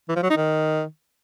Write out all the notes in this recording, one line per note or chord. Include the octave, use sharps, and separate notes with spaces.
E3
F3
F#3
D#4
D#3